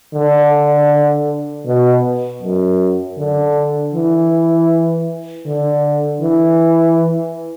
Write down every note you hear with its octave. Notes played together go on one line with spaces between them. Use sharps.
D3
B2
F#2
D3
E3
D3
E3